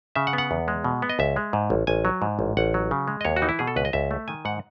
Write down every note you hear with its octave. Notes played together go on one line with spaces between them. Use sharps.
C#3 E5
F#5
B3
F#5
E2
G#3
B2
B3
D#5
C#2 E5
G#3
G#2
A1
A1 G#5
F#3
G#2
A1
A1 F#5
F#3
C#3
G#3
D#5
D#2 C#5
F#4
E3 D#4
E4
B2 G#4
A4
C#2 B4
D#5
C#2 E5
A3
D#3 G#5
G#2 F#5